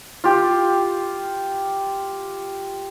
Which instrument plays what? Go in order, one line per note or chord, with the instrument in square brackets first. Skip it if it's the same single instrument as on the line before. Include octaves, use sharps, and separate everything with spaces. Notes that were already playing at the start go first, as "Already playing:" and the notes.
[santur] F4 G4